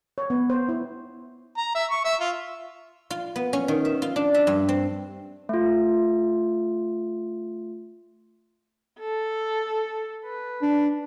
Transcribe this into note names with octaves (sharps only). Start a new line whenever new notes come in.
C#5
B3
C5
E4
A#5
E5
C#6
E5
F4
F4
B3
C#4
D#3
E5
F4
D4
E5
G2
C4
A3 F4
A4
B4
D4